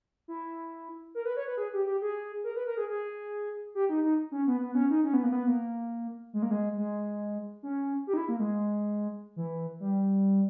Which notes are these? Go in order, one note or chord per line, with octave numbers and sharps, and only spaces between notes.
E4
A#4
B4
C#5
B4
G#4
G4
G4
G#4
A#4
B4
A#4
G#4
G#4
G4
D#4
D#4
C#4
B3
B3
C#4
D#4
C#4
B3
A#3
B3
A#3
G#3
A#3
G#3
G#3
C#4
G4
D#4
E4
A#3
G#3
E3
G3